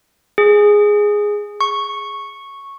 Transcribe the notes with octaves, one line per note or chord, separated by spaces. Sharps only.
G#4
C#6